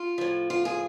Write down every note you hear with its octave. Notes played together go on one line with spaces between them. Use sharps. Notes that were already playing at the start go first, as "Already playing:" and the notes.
Already playing: F4
A2 F3
F4
G#4